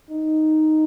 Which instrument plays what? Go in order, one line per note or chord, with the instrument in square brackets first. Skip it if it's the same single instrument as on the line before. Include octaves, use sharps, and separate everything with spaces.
[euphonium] D#4